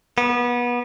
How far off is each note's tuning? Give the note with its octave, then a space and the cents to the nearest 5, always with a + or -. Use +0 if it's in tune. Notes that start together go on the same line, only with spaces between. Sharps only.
B3 -25